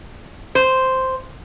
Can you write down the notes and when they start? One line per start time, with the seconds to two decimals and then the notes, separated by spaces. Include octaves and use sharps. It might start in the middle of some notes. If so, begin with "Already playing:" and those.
0.55 C5